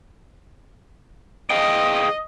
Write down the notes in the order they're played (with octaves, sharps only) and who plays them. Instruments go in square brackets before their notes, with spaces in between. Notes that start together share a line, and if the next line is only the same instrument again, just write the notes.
[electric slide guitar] G#4 F5 G5 [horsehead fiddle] D#5